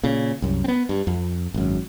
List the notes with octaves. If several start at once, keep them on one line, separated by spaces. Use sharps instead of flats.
A#2 C#3
C2 F#2
B3 C4
G2
F2
G#1 F#2